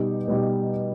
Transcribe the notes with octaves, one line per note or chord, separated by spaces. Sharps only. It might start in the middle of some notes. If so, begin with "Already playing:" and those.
Already playing: B2 G3 D#4 G4
B2 G3 D#4 G4